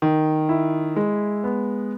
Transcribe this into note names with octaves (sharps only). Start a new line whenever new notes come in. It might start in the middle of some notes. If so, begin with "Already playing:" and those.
D#3
E4
G#3
B3